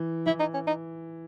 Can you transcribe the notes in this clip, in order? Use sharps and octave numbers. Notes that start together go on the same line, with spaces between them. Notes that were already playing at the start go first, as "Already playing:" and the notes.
Already playing: E3
E3 E4
D#4
C#4
D#4